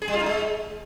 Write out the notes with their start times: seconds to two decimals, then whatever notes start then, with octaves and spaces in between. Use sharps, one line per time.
0.02 G#4
0.08 G3
0.14 F4
0.20 D#4
0.26 G#3